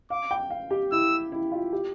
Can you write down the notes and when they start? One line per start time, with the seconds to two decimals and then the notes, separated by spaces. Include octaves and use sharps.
0.10 F5 D6
0.31 G5
0.50 F5
0.71 G4
0.92 E4 E6
1.32 E4
1.52 F4
1.73 G4